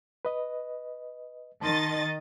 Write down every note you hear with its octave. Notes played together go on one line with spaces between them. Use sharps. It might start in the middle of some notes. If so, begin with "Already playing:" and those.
B4 D#5
D#3 D#5 A5 C6 A6